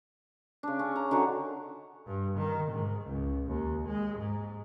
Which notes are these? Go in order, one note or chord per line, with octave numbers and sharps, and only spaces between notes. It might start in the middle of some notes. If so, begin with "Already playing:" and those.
C#3 D4
C#4
A#5
D3 D#3 F#4 G#4
G2
D#3
G#2
C#2
D#2
G#3
G#2